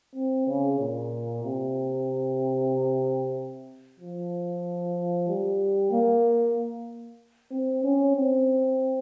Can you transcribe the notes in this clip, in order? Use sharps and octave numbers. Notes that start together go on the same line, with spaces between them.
C4
C#3
A#2
C3
F3
G3
A#3
C4
C#4
C4